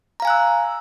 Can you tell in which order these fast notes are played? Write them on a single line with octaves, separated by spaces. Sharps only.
A#5 F5 G#5 F#6 E6